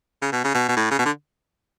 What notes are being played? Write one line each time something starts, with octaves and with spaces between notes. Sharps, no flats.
C#3
B2
C#3
B2
B2
A2
C#3
B2
D3